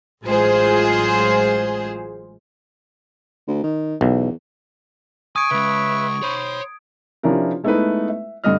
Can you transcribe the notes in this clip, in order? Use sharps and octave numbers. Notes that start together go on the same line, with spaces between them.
A1 F#3 G#3 F4 G#4 C5
D2
D#3
B1 E2
G#5 C#6 D#6 G#6 D7
C#3 G#3 B4 E5
C5 C#5 B5
C3 F3 C#4 D4 E4 A#4
G#3 A3 B3 D#4 E4 B4
E5
G2 D3 D#5 F6